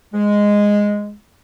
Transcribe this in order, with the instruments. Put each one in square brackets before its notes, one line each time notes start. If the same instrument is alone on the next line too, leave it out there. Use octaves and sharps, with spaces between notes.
[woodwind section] G#3